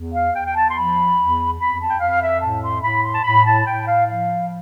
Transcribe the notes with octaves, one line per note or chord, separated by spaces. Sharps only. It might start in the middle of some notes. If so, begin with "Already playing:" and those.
Already playing: E2
F5
E2 G5
G5
A5
C6
F3 B5
E2
F2 B5
A5
G5
F2 F5
E5
A2 A5
C6
A2 B5
C6
A5
A2 B5
A5
A2 G5
F5
F3 F5